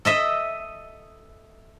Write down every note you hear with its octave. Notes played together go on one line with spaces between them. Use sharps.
A4 D#5 E5